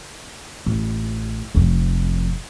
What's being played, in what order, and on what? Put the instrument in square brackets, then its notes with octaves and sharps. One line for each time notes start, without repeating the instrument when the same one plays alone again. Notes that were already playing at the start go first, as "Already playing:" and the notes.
[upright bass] A1
F1 F2